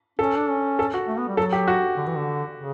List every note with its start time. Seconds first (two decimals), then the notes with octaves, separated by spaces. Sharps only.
0.19 C#4 A4
0.37 D4
0.50 C#4
0.79 A4
0.94 F#4
1.08 A3
1.18 B3
1.28 G3
1.37 F#3 A4
1.52 G4
1.67 F#4
1.97 D3
2.07 E3
2.16 D3
2.56 C#3